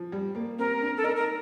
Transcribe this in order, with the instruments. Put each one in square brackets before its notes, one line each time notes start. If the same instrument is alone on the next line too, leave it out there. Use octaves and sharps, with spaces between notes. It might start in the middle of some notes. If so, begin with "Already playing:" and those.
Already playing: [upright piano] F3
G3
A#3
[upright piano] C4 [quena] A#4
[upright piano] D4
[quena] A4
[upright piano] D#4 [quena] A#4
[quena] A#4